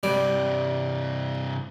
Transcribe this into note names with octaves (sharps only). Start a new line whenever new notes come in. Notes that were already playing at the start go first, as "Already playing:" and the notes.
G2 C3 G3